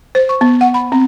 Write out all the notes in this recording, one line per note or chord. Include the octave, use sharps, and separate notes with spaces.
C5
C#6
B3
F#5
B5
C4